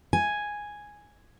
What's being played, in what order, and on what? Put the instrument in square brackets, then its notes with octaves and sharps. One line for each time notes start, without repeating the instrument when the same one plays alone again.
[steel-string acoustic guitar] G#5